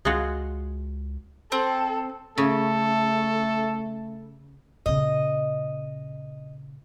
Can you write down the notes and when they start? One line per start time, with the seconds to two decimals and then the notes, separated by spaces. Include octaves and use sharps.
0.05 C#2 G#3 F4 F#4
1.52 C4 A4
2.38 C#3 A3 A4
4.86 A#2 C#3 D#5